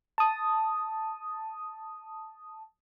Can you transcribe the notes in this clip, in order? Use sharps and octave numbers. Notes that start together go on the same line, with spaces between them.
A5 D#6